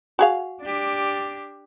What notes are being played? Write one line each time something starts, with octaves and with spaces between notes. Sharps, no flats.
F#4 G#4 F5
D4 G4